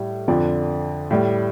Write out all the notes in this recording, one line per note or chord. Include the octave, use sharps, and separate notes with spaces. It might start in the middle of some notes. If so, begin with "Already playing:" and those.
Already playing: A2 G3
F2 D3 F3 D5
A2 G3